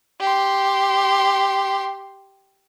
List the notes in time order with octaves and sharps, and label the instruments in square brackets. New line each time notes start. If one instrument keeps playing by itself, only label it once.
[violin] G4 C6